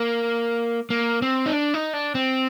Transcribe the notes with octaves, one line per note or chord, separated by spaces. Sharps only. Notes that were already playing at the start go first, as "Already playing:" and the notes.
Already playing: A#3
A#3
C4
D#4
D4
D#4
D4
C4